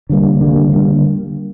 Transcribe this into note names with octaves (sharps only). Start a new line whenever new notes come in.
D3 G3 A#3
D3 G3 A#3
D3 G3 A#3